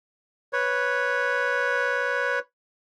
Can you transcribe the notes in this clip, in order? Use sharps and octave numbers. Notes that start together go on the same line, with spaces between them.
B4 C#5